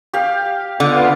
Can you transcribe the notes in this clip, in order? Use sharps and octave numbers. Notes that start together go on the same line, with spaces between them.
G4 F5
D3 B3 F4